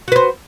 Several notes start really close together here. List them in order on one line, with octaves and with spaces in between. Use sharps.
F#4 B4 C5